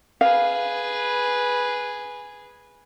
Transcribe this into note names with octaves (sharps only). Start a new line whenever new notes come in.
G#4 B4 F5